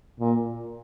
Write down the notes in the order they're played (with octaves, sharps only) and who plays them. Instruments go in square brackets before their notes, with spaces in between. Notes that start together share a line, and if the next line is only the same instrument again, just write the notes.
[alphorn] A#2